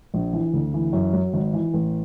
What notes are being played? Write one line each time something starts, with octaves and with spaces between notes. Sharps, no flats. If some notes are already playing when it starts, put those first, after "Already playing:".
A#1
E3
D2
E3
F#2
F#3
G#1
E3
A1